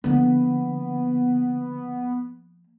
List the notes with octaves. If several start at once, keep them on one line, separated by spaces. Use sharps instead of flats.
D3 F3 A#3 B3